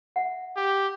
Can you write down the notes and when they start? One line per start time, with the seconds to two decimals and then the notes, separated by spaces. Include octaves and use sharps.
0.16 E5 F#5
0.57 G4